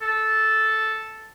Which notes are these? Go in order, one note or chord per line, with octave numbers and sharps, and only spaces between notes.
A4